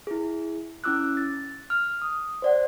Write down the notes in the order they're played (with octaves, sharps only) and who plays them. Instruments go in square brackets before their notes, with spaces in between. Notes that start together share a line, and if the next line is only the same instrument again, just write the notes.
[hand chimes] E4 G#4
C#4 E4 D6 E6 F#6
A6
F6
D#6
C5 D5 F#5